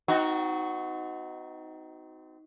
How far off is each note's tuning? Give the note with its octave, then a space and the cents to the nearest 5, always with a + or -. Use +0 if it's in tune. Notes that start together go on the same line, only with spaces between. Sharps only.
C4 -35 D#4 +15 F#4 +0